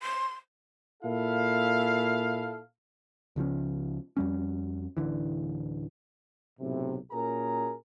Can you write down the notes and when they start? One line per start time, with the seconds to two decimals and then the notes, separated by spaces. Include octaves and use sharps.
0.02 C6
1.03 A#2 E4 A4 F5
3.36 C#2 C#3 F3 C#4
4.17 F2 G3 C#4
4.97 D1 A#1 D3 E3
6.60 B1 A2 C3
7.12 A#2 C#4 F#4 G#4 A#4 A#5